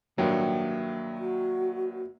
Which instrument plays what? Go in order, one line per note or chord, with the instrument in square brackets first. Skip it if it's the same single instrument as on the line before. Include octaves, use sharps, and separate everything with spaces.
[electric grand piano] G2 D#3 F#3 [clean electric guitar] A#3 E5 G5
[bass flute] F#4